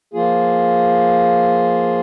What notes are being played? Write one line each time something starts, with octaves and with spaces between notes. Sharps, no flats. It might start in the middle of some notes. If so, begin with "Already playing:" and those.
F3 A#3 F4 G#4